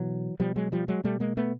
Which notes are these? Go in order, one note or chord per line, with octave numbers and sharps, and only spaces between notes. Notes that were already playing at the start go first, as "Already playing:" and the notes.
Already playing: B2 E3 F#3
B2 F3 G3
F#3 G#3
F3 G3
F#3 G#3
B2 G3 A3
G#3 A#3
A3 B3